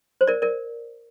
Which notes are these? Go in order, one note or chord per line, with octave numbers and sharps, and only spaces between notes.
C5
A#4 D5
A#4 D5